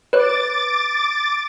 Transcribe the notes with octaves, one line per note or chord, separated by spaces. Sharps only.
B4 C#5 D6 F#6 A6